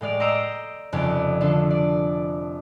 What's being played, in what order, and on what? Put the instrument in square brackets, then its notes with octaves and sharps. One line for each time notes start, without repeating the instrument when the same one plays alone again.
[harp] A2 G#3 D5 F6
D#5 A#5 C6 E6 G6 D7
F1 F2 C#3 G3 D5
D3 D4 F4 A4
D5